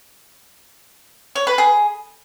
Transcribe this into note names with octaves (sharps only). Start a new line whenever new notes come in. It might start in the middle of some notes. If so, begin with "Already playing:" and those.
C#5
B4
G#4